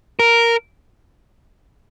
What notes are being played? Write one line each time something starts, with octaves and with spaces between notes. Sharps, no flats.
A#4